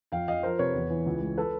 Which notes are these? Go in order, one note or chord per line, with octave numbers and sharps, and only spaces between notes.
F2 F5 G5
F2 D#5 F5
F3 A#4 C5
C3 B4 C#5
E2
E3
C#2
G#3
A4 B4